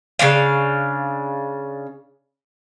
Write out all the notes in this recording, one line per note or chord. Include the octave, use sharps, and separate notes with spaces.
C#3 A#3 D4 F5